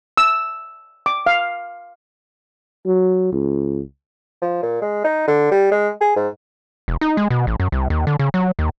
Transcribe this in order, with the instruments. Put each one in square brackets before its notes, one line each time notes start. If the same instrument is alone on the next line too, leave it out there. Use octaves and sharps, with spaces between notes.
[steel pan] E6
D6
F5
[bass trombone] F#3
C#2
[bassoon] F3
A#2
G#3
D#4
D3
G3
G#3
G#4
G#2
[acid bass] E1
D#4
G#3
B2
A1
F#2
C2
D#2
D3
C#3
F#3
D#2